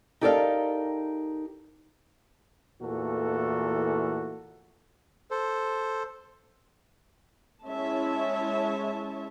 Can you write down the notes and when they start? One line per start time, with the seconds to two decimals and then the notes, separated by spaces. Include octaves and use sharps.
0.21 D#4 G4 A4 A#4 D5 F5
2.81 E2 A#2 E3 A3 F#4 A4
5.31 A4 C5
7.67 G#3 C#4 E4 C#5 E5 A5